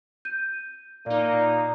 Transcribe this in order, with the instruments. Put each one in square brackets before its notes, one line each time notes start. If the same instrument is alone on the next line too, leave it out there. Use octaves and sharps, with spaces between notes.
[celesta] G6 D#7
[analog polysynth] A#2 D#4 [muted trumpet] A#3 [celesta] D5